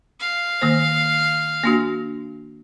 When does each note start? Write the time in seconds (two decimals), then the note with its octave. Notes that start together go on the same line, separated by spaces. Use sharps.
0.20 F5
0.61 D#3 A#3 C5
1.64 A#3 D4 F#4